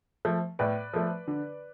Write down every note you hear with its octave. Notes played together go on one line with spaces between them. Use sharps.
F3 A3
A2 B4 D5
F3 A3
D3